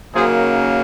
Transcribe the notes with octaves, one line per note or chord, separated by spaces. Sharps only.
F#2 C#3 F#3 A#3 D#4 G#4 C5